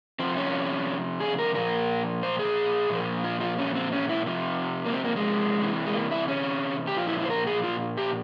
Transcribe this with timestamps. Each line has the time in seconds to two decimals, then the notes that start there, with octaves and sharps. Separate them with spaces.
0.19 C3 F3 C4
0.37 C#4
1.20 G#4
1.38 A#4
1.55 A#2 F3 A#4
2.23 C5
2.39 G#4
2.90 A#2 F3
3.24 F4
3.40 F4
3.58 C#4
3.75 C4
3.92 C#4
4.09 E4
4.26 C3 F3
4.85 A#3
4.93 C4
5.05 A#3
5.16 G#3
5.62 C3 E3
5.86 G#3
5.94 A#3
6.11 E4
6.28 C#4
6.87 G4
6.97 A#2 F3 F4
7.07 E4
7.19 E4
7.26 C5
7.30 A#4
7.47 G#4
7.63 F4
7.97 G4